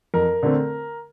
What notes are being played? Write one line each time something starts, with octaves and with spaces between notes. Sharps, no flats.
F2 A#4
D3 A3 C4